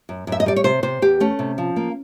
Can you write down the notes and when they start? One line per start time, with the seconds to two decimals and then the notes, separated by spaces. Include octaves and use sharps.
0.09 F#2
0.27 F#2
0.32 E5
0.40 D#5
0.46 G3 D5
0.56 C#5
0.64 C3 C5
0.83 C3 C5
1.02 E2 G4
1.20 A3 C#4
1.39 C3
1.58 F3
1.76 A#3